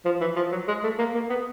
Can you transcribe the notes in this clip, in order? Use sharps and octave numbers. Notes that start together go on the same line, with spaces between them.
F3
E3
F3
F#3
G#3
A3
A#3
A#3
B3